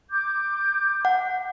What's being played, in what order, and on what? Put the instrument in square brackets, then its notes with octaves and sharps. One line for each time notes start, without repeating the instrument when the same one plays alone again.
[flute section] D6 G6
[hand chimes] F#5